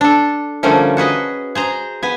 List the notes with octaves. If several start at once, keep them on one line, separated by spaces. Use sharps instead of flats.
D4 A4
D3 F3 G3 A3 A#3 C#4
F#4 G#4 B4 D#5
G#4 C5 A#5
B3 B4 G#5